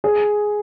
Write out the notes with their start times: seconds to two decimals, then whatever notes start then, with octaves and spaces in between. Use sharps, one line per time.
0.04 G#4